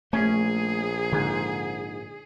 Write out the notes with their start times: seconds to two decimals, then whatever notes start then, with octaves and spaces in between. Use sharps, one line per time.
0.13 A#1 A3 C#4 G#4
1.12 G#2 D3 G#5